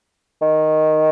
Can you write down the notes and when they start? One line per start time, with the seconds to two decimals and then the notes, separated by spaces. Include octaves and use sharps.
0.42 D#3